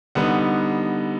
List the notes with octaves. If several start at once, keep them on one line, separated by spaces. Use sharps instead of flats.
D3 G3 B3 D#4 F#5